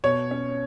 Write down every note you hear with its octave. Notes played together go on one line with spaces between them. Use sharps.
B2 C#5
C#4